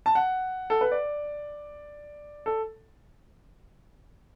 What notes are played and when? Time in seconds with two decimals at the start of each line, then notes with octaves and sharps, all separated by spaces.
0.06 A5
0.15 F#5
0.70 A4
0.81 B4
0.92 D5
2.46 A4